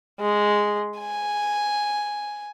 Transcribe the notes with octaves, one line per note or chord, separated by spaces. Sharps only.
G#3
G#5